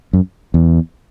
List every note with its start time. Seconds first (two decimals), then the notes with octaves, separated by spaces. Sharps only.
0.13 F#2
0.54 E2